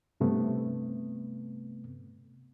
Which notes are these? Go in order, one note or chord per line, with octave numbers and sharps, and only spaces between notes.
G2 C3 A3 B3